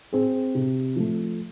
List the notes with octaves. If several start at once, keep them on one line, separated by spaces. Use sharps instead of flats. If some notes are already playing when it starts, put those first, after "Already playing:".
C4 G#4
C3
F3 A3